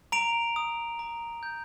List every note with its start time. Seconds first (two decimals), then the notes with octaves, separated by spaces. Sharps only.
0.12 A#5 D7 F7
0.56 D#6
0.99 A#5
1.43 G6